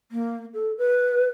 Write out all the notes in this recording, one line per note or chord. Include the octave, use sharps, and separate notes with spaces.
A#3
A4
B4